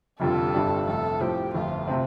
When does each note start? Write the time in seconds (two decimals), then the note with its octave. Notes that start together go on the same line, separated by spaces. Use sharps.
0.20 F1 F2 D3 G3 F4 A4
0.54 G1 G2 G3 D4
0.87 F1 F2 C3 A3 A4
1.21 A2 F3 C4 G4
1.54 G1 F2 F3 A3 F4
1.88 C3 A3 C4